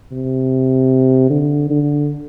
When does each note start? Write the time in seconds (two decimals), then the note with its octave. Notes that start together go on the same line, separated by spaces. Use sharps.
0.13 C3
1.30 D3
1.70 D3